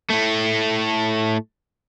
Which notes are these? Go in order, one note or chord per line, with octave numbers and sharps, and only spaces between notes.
A2 A3